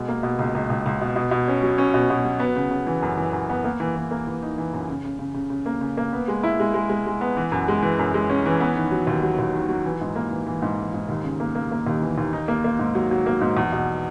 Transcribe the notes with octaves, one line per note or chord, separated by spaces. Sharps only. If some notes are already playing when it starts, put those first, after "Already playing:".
Already playing: B2 G#3
A#3
B2
C#2
C#2
C#2
C#2
B2
B2
B2
C#4
F#3
C#4
B2
B2
F#3
B3
C#3
C#3
E3
F#2
E3
F#2
B3
A#3
E3
E3
A#3
E3
D#4
E3
F#2
C#3
C#3
C#3
C#3
C#3
A#3
C#3
A#3
B3
G#3
E4
G#3
G#3
G#3
G#3
B3
E3
F#2
G#3
E3
F#2
G#3
C#4
E3
B3
D#3
F#3
D#2
F#3
D#2
D#3
F#3
E3
G#2
A#3
E3
E3
G#2
E3
G#2
D#2
C#3
A#3
A#3
A#3
D#2
E3
D#2
D#4
A#3
A#3
G#2
F#3
F#3
A#3
G#2
E2
B2